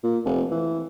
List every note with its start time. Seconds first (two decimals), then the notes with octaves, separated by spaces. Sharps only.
0.03 A#2
0.25 F1
0.51 E3